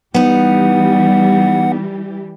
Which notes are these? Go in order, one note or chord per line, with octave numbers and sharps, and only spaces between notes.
E3 G3 B3 D#4 G4 F#5